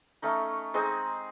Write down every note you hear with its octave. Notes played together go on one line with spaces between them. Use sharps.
A3 C#4 D#4
G#3 C4 D#4 G#4